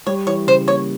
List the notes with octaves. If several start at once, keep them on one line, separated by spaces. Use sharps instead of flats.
G3 C#5
E3 C#5
C#3 C5
A#3 C#5